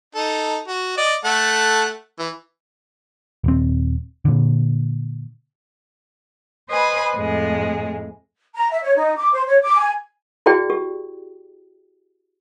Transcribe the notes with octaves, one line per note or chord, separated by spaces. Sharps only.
D#4 A4
F#4
D5 D#5
A3 A4 F#5
E3
D#1 C4
A#2 D3
B4 C5 D#5 G#5 B5
F2 A2 G#3
A#5
E5
C#5
D#4
D6
C5
C#5
D6
G#5
E4 F#4 G#4 D5 G5
G4